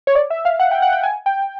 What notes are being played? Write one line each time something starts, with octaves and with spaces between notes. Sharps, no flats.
C#5
D5
E5
F5
F#5
G5
F#5
G5
G#5
G5